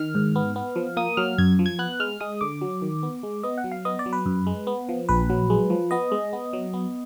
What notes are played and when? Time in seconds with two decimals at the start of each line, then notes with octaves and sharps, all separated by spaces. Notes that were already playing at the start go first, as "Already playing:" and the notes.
Already playing: D#3 F6
0.15 G#2
0.36 B3
0.56 B3
0.76 F3
0.97 A#3 D#6
1.17 F#3 F6
1.38 F#2 G#6
1.59 F3
1.66 G#6
1.79 B3 F#6
2.00 G#3 F6
2.21 G#3 D#6
2.41 D3 D6
2.61 F#3
2.82 D#3
3.03 B3
3.23 G#3
3.43 B3 D#5
3.58 F#5
3.64 F#3
3.71 F5
3.85 B3 D#5
3.99 D5
4.06 F#3
4.13 B4
4.26 F#2
4.47 G#3
4.67 B3
4.89 F3
5.09 A#1 B4
5.30 F#3
5.50 G#3
5.70 F3
5.91 B3 D#5
6.12 G#3
6.33 B3
6.53 F#3
6.74 B3